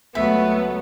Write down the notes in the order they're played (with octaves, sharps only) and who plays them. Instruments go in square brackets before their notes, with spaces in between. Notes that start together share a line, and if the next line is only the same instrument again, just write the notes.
[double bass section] C#2 F#3 A3 [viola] B3 [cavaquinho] E5